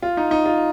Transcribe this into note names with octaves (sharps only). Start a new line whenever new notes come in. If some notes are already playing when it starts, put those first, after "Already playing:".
F4
D#4
D#4
F4